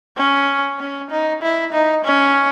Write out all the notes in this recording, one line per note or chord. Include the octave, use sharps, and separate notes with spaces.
C#4
C#4
D#4
E4
D#4
C#4